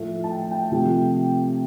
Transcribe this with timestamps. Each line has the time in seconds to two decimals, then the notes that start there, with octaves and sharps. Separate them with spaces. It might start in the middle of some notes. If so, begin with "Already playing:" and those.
Already playing: A2 F3 A3 E5
0.24 A5
0.31 G5
0.51 G5
0.72 C3 F3 A3